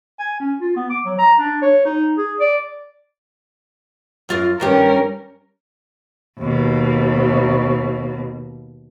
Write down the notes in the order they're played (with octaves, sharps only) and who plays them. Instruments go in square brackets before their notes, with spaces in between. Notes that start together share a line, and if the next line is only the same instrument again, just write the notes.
[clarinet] G#5
C#4
F4
B3
D6
F#3
A#5
D4
C#5
D#4
G#4
D5
[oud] F#2 F4 A#4
[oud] G2 D#3 G4 [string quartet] G3 C#4 A#4
[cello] D#2 B2